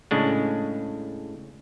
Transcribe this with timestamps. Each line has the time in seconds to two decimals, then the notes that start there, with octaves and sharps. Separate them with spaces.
0.11 A2 C#3 G#3 D4